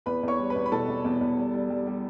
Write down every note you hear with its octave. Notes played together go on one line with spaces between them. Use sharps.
E2 B4 B5
E2 C#5 C#6
G3
B4 B5
E2
B5
B2 A4 A5
E2
E2
E2
G3
G3
G3
G3